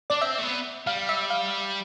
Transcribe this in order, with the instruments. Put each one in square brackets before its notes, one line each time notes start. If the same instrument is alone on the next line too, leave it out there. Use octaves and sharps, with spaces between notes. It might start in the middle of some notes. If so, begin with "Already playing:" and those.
[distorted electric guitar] D4 [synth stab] D5
[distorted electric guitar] C4 [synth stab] E5
[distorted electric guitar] A3
B3
[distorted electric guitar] G3 [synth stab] F5
[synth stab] E5
F5